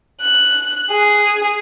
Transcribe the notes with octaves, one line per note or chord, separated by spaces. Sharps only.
F#6
G#4